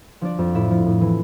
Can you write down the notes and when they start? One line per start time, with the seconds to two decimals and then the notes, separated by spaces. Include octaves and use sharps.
0.21 F3 D4 D5
0.39 F2
0.55 A2 E4 E5
0.71 F3
0.86 A2
1.01 E3